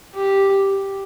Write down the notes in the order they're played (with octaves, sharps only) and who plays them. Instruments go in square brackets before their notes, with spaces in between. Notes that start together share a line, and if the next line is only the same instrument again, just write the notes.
[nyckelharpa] G4